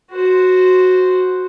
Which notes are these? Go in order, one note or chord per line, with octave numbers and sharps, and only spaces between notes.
F#4 C5